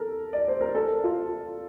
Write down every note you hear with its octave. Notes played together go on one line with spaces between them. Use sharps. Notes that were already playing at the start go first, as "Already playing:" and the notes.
Already playing: A4 A#4
D5
C5
A#4
A4
F4